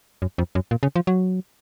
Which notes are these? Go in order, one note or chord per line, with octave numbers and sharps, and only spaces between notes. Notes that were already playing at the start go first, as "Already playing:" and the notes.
F#2
F2
F#2
A#2
C#3
F3
F#3